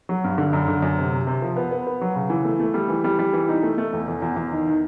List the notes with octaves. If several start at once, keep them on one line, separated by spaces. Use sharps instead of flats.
F#3
G2
D3
F#2
D3
F#2
C3
C3
C3
F3
B3
B3
B3
F#3
C#3
E3
A3
A3
G3
E3
G3
G3
E3
D#4
A3
A3
E2
E2
E2
E2
D#3
D#3